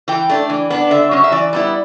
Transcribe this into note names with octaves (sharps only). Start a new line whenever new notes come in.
E3 G5
A3 D4
E3
B3 D4
D3 E5
F#3 C#4
E5
E3 D5
G3 B3 E4